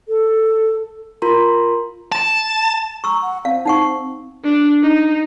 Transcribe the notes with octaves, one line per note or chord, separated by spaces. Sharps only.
A4
F4 A#4 A#5 C6
A5
A#5 C#6 E6
F#5
C4 F5
D#4 F#5 C#6
D4
D#4